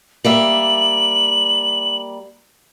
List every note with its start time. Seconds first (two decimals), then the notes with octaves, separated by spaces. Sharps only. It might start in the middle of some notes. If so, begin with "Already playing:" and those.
0.25 G3 A#3 E5 F#7